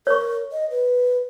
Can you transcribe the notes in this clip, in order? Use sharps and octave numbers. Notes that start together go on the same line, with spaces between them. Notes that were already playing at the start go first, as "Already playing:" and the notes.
A#4 C#5 C#6
D#5
B4